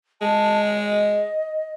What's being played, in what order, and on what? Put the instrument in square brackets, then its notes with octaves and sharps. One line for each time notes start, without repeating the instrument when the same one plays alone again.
[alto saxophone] G#3 [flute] A5
[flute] D#5